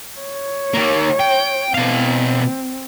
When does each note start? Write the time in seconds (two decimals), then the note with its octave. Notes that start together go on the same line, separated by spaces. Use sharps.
0.19 C#5
0.74 D#3 A#3
1.20 G5
1.74 B2 C4 F5